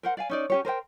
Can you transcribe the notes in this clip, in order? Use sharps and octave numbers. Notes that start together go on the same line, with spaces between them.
A#4 C5 F#5
D5 F5 G#5
C#4 D#4 D5
C#4 G4 C#5
A#4 C5 D#5 G5